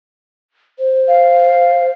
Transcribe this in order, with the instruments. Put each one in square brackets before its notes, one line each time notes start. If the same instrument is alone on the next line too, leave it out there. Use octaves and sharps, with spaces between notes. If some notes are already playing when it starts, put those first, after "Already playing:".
[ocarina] C5
[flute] F5